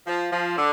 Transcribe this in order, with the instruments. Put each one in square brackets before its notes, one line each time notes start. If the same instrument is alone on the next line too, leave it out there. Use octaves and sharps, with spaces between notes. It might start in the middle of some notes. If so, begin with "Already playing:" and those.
[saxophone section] F3
F3
D3